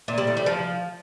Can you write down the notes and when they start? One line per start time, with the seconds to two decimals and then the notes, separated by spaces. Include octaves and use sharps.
0.08 A#2
0.18 G3
0.27 A2
0.37 G3
0.46 F3